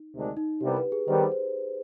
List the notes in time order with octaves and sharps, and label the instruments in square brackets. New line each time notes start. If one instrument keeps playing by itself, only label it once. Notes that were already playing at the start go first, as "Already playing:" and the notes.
Already playing: [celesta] D#4
[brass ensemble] D2 C3 D#3 G#3 D4
[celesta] D#4
[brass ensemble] C2 C3 G3 B3 [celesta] G4
[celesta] B4
G#4
[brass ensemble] D#3 G3 B3 [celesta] C5
[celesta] C5